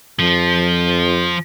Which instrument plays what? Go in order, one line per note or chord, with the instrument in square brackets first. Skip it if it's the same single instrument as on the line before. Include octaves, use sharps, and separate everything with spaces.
[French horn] F2 [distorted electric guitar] F3